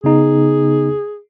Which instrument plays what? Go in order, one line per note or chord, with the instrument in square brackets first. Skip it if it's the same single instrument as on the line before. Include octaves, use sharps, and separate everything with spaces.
[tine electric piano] C#3 B3 D#4 [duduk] G#4